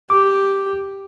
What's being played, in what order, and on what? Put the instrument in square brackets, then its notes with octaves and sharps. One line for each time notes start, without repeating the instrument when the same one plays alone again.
[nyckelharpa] G4 [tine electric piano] D6